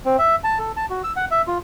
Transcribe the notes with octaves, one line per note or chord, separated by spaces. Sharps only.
C4
E5
A5
A4
A5
F#4
E6
F#5
E5
F4